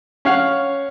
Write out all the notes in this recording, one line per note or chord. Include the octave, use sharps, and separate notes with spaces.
C#4 C#5 F5 F#5